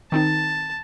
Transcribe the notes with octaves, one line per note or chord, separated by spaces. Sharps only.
D#3 C4 D#4 A5